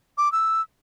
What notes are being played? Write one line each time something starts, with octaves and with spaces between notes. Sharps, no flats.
D6
E6